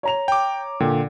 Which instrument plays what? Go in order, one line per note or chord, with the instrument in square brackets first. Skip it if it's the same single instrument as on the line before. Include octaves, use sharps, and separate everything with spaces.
[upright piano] C#5 A#5 F7
[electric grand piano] G5 D6
[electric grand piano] A#2 [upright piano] D3 G5